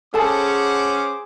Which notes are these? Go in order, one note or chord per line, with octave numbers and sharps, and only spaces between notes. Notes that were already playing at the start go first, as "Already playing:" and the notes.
C#4 G#4 A4 C5 F#5 A5 D6